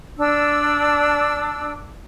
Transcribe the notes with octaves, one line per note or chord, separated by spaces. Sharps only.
D4 E6